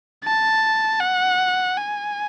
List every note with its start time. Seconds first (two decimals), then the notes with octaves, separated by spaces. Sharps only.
0.25 A5
1.01 F#5
1.77 G#5